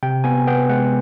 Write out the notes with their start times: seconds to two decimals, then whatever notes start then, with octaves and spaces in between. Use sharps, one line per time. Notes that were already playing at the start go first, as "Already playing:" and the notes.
0.03 C3 G5
0.24 B3 G#5
0.47 B3 G5
0.69 G#3 F#5